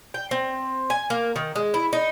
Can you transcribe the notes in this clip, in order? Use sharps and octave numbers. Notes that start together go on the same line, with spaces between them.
G5
C4
G#5
A#3
D#3
G#3
E4
D#4